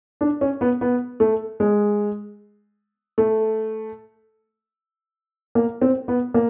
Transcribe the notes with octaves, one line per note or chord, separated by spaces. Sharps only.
D4
C#4
B3
B3
A3
G#3
A3
A#3
C4
B3
A#3